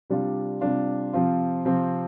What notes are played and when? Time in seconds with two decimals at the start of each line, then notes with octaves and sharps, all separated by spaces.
0.10 C3 G3 D4 F4
0.61 C3 G3 D4 F4
1.13 C3 F3 C4 F4
1.65 C3 F3 C4 F4